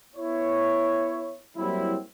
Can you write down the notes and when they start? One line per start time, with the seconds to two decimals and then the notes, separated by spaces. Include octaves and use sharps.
0.16 B3 E4 C#5
1.57 F#3 G3 A#3 C4 E4